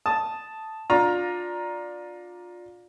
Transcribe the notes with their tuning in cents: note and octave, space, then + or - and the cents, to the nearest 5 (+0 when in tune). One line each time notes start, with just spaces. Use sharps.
A5 +0 D#6 +0
D4 +0 F4 +25 A#5 +10